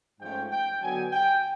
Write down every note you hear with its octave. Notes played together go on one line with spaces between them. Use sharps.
G#2 F3 A3 C#4 G5
G5
D3 F#3 B3 G#5
G5